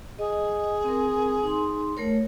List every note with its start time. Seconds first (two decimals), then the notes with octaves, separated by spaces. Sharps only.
0.19 G#4 D#5
0.84 C4 A#4
1.43 D#4 C6
1.97 A3 A#4 C#5